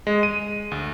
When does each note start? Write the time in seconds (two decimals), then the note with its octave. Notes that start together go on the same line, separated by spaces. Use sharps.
0.07 G#3
0.23 D#7
0.71 D2